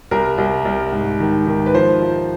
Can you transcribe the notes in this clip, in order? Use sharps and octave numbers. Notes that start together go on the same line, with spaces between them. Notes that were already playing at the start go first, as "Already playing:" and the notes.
C2 A#4
C2
C2
G#2
D#3
D#3
B4
F3 C5
F3